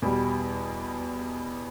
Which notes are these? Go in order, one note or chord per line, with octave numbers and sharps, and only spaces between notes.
E2 B2 G3